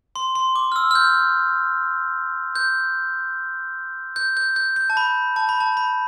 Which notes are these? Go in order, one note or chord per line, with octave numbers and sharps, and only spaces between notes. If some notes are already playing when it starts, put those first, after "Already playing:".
C6
C6
D6
F6
E6
F6
G6
G6
G6
G6
G6
G6
A5
B5
A5
B5
A5
B5